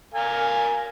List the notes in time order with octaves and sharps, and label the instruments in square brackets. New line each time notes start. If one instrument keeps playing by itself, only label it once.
[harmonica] A#4 F5 G#5